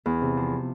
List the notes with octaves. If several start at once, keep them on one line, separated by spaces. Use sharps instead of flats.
E2
C3
F3